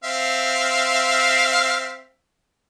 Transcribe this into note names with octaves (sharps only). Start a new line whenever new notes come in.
C4 E5 F5